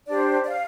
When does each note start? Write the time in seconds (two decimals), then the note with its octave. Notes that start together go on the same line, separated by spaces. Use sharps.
0.07 D4 G4 C5 D5
0.44 D5
0.50 F5